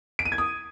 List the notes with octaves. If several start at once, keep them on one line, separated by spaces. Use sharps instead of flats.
D7
D#7
G#6
D#6